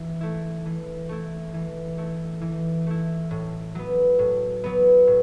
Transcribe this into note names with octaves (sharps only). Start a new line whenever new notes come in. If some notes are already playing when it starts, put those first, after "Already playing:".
Already playing: E3
A3 E4
E3
A3 E4
E3
A3 E4
E3
A3 E4
A2
F#3 B3
A2
F#3 B3
A2